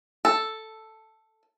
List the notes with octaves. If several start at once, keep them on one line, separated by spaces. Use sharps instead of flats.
A4